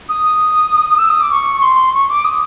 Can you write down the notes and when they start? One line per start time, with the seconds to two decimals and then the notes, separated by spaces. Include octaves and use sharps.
0.09 D#6
0.98 E6
1.10 D#6
1.21 D6
1.32 C#6
1.57 C#6
1.62 C6
1.93 C#6
2.09 D6
2.25 D#6